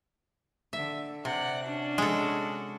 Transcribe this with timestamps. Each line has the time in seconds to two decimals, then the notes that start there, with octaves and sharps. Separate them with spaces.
0.73 D3 E5
1.25 C3 D5 F#5
1.63 C#4 D4 F#4
1.98 G#3 A4